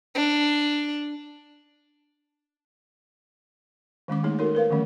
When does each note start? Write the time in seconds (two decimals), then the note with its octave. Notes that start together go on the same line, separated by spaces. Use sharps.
0.15 D4
4.08 D#3 G#3 C#4 D6
4.23 A3 A#3 D#4 G#4 C#5
4.39 D#4 F#4 A4 A#4 C#5
4.55 A#4 B4 F5
4.70 D3 D#3 F3 G3 A3 C#4